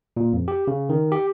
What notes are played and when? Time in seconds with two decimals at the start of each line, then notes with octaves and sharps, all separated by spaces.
0.17 A#2
0.33 F2
0.48 G4
0.67 C#3
0.89 D#3
1.12 G4